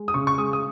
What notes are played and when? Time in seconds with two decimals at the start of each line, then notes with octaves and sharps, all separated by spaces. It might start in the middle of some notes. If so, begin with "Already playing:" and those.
Already playing: G#3
0.08 D#6
0.14 C#3 C#6
0.27 C#6
0.38 G#3 D#6
0.53 D#6